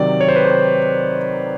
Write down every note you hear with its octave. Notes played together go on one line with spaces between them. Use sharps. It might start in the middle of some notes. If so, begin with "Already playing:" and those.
Already playing: C3 D#3 F#3 D5
C#5
C5
B4
C5